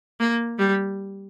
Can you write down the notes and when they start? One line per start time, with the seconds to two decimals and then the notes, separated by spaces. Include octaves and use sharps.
0.20 A#3
0.59 G3